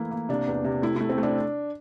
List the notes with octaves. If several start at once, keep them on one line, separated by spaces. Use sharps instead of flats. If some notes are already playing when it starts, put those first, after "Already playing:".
Already playing: E3 A3 A#3 E4
A#3
C3 D4
E2
C3
A3 E4
E4
A3
C4
A3
D4